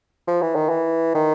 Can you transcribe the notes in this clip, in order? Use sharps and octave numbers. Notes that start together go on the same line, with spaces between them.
F3
E3
D#3
E3
D#3